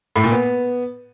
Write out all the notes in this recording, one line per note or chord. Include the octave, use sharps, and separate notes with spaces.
A2
A#2
B3